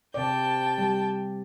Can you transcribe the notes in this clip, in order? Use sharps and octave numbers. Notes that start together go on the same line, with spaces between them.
C3 D5 G5 A5
G3